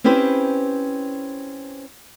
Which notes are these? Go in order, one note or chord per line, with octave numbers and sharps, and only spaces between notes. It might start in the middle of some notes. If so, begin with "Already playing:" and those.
C4 C#4 E4 G4 B4 C5